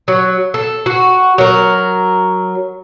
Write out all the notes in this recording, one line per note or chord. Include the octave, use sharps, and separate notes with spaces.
F#3
A4
F#4
F#3 A#4